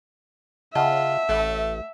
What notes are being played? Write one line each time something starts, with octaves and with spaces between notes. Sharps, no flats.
C#3 F4 D#5 E5 F#5 A5
A1 A3